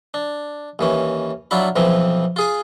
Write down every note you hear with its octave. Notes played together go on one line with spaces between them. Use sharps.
D4
D#2 E3 C#4
F#3 D4 E4 F4 B5
B1 E3 F3 C4
F4 G#4 G#5